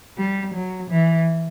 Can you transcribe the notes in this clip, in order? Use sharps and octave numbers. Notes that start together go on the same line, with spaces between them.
G3
F#3
E3